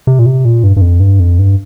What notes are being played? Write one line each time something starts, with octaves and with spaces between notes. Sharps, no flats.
C3
A#2
C3
A#2
G2
G2
F2
G2
F2
G2